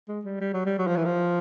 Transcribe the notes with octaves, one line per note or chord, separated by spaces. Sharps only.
G#3
G3
G3
F#3
G3
F#3
F3
E3
F3